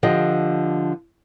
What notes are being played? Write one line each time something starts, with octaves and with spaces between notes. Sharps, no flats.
D3 F3 G4 D#5